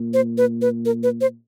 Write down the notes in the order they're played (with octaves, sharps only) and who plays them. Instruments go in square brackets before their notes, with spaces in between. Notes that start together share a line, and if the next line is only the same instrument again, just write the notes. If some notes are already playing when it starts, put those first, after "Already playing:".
Already playing: [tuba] A#2
[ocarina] C5
B4
B4
A#4
B4
C5